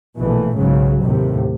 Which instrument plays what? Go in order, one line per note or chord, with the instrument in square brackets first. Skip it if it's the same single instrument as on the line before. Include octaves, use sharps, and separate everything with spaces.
[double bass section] A#1 B2 E3 A3
B1 G#2 C#3 F#3
D#2 A2 C3